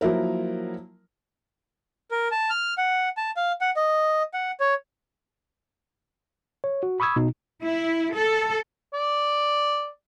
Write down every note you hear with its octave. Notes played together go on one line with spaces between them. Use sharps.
F3 F#3 A#3 E4 A#4
A#4
A5
F6
F#5
A5
F5
F#5
D#5
F#5
C#5
C#5
F#4
B5 C#6 D#6 E6 G#6
B2 D#4
E4
A4
D5